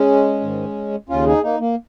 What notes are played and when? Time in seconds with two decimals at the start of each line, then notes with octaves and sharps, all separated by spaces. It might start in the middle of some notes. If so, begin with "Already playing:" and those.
Already playing: G#3 C#4
0.41 G#2 D#3
1.09 D#2 C#3 C#4 F4
1.26 D#4 G#4
1.43 A#3 D#4
1.60 A#3